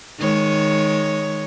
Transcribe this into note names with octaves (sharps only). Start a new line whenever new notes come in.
D#3 G#3 C#5